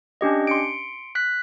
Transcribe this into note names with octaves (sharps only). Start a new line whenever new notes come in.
C#4 D4 G4 D#5
C6 C#7 D7
F#6 B6